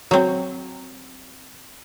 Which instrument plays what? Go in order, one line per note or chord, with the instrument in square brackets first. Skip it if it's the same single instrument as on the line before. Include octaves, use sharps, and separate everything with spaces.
[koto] F#3 C4